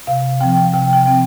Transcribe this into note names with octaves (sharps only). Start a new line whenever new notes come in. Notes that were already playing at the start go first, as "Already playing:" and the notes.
C3 F5
F3 C4 G5
C3 G5
G5
F3 C4